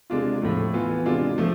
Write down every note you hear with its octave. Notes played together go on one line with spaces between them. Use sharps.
C3 G#3 D4 F4
A2 F3 A3
E3 B3 F4
C3 G#3 D4 F4
F3 A3